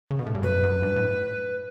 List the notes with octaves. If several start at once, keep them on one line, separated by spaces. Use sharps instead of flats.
C#3
B2
A2
G2
F#2 B4
F#2
G2
A2